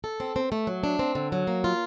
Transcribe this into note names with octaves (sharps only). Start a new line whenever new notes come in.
A4
C4
C4
A3
F#3
D4
C4
D3
F#3
A#3
F4